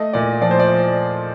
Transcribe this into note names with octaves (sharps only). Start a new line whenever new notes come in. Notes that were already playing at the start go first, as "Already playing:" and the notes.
Already playing: A3 D#5
A#2 D5
F3 D5
C5
D5